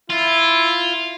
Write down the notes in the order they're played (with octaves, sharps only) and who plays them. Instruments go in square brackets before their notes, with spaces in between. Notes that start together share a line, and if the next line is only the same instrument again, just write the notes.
[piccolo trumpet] E4 [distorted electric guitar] F4